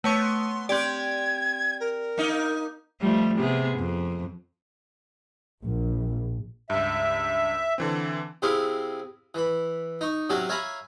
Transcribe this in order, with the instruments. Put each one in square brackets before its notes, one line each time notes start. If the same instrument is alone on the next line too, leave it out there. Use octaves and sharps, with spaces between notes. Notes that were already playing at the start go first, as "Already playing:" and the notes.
[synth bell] A3 C#5 C#6 [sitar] B3 [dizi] G6
[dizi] C6
[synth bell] C4 D5 [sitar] G4 [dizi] G#6
[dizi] A#4
[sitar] A#3 D#4
[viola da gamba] F3 G3 A3
C3 B3 G#4
F2
[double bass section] A#1
[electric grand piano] C#2 G2 [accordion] E5
[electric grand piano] D3 E3 C4
[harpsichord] C3 C4 E4 G#4 F5
E3 B5
D#4 C#6
C3 F#3 C#4 F#4 G#5
C#5 E5 F5 G#5 A#5 B5